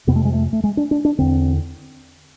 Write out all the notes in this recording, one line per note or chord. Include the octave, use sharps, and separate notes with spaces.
F2 C3 B3
A3
G#3
A3
A3
G#3
D4
D4
D4
E2 D3 C4